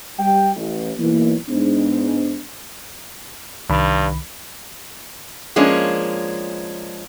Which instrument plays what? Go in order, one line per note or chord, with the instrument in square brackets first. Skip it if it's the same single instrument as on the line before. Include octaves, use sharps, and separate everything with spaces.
[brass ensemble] G3 G5
A1
B1 E3 A#3
G#2 B3 D4
[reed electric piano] C2 D#3 B5 [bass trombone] G2
[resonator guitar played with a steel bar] F3 G#3 A#3 C#4 D4